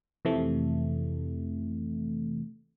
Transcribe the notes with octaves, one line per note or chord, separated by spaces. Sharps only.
F2 C3 E3 A3